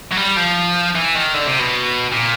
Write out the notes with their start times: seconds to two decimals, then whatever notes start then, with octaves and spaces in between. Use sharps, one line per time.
0.12 F#3
0.17 G3
0.36 F3
0.95 E3
1.15 D#3
1.34 D3
1.47 C3
1.60 B2
2.12 A#2